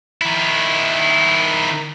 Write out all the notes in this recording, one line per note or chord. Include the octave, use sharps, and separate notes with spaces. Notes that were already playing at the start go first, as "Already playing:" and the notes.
D#3 E4